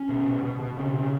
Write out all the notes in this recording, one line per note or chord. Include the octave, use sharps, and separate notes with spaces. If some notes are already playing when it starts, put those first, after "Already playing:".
Already playing: C#4
B2
B2
B2
B2
C#3
C#3